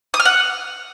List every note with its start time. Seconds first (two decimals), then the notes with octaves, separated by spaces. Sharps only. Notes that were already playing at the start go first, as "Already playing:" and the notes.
0.14 D#6
0.20 F6
0.25 F#5